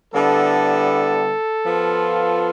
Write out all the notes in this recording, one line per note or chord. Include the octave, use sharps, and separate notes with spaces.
D3 G3 B3 E4 A4
F3 B3 F4